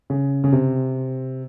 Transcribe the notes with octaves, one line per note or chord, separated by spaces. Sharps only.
C#3
C#3
C3